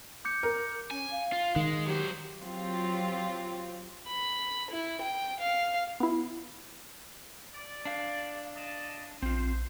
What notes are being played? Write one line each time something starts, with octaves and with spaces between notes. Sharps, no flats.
D6 G6 C#7
A#4
C#4 G#5
F5
F4
D#3 G#3
F#3 G4 C5
F#3 C4 F4 G4
B5
E4
G5
F5
B3 E4
D5
D4 F5
D5 D#5 A5
A#1 C4 F4 C5